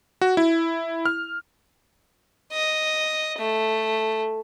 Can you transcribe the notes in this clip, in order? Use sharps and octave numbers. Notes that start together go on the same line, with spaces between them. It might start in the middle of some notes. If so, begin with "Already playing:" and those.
F#4
E4
F6
D#5
A3